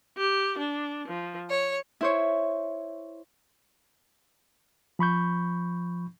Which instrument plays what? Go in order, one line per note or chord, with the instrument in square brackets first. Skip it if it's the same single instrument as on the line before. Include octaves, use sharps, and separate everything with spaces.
[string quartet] G4
D4
F3
C#5
[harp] E4 C5 C#5
[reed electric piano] F3 B5 C#6 G6